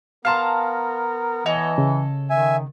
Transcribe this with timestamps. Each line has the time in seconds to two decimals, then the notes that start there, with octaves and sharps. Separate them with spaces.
0.25 B3 A#4 F5 A5 A#5 C6 F6
1.46 E3 A4 C#5 D#5
1.78 C#3
2.30 D#3 E5 G#5